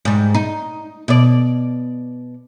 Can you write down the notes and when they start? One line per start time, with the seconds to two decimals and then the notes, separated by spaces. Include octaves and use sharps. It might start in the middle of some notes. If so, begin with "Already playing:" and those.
0.05 G#2 G3
0.35 D#4
1.08 B2 D5